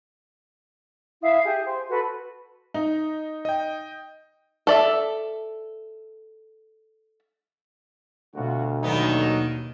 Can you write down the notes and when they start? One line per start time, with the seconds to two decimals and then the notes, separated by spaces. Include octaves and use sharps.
1.22 E4 E5 F5 D#6
1.44 G4 G#4 E5
1.64 C5 G#5
1.89 F#4 A4 B4
2.74 D#4
3.45 D#5 G5
4.67 A4 D5 E5
8.35 D2 B2 F4 F#4
8.83 D#2 B2 D3 D#3 F#3 B3 D#4 D#5